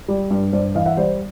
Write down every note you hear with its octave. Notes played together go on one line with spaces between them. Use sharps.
G3
G2
G2 C5 D5
E3 D#5 F5
E5 F#5
G3 C5 D5